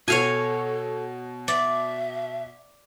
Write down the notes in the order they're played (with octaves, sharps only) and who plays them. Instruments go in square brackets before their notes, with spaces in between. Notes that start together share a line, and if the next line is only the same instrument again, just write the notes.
[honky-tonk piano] B2 [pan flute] A4 [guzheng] C#5 F5 G#5
[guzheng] D5 [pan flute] E5